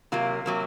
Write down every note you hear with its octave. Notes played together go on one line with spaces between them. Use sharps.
C3 F#3 A#3 F4
C3 F#3 A#3